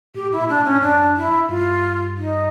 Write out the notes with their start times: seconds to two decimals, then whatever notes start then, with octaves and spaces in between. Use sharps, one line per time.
0.14 A2 G4
0.32 E4
0.37 A#2
0.49 D4
0.59 A2
0.65 C#4
0.81 F#2 D4
1.16 E4
1.49 G2 F4
2.16 D#4